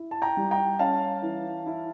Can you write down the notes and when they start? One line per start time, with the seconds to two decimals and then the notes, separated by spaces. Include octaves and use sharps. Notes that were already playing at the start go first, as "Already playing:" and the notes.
Already playing: E4
0.11 A5
0.22 G5 A#5
0.37 G3
0.51 G5 A#5
0.79 C#4 F5 A5
1.22 E3
1.66 E4